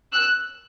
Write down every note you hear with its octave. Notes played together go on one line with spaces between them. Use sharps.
E6 F#6